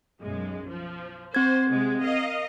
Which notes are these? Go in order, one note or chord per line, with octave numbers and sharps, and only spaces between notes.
B1 F#2 G#3
F3
C4 C5 G#6
C3 G#3
A#4 D#5 F5